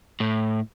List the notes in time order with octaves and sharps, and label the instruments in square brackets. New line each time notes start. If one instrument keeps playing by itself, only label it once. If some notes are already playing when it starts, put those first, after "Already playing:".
[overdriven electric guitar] A2